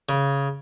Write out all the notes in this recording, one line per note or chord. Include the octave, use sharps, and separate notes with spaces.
C#3